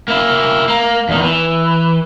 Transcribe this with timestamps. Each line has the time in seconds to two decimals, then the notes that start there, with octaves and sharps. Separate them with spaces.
0.08 A#3 E4
0.68 A#3
1.09 E2 D#3
1.22 E3